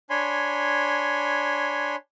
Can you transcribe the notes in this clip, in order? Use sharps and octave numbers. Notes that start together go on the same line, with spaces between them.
D4 C#5 G#5 B5 C6